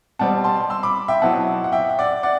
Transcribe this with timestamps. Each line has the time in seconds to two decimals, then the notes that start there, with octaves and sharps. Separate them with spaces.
0.19 B2 G3 C4 F#5 A5
0.44 A5 C6
0.70 C6 E6
0.83 B5 D6
1.08 E5 G5
1.22 B2 F#3 C4 E4 F#5 A5
1.64 F#5
1.72 E5 G5
1.89 E5
1.99 D5 F#5
2.23 D5 F#5